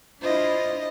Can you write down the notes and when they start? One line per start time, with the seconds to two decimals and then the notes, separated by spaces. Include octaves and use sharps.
0.21 D4 E4 F4 C5 D#5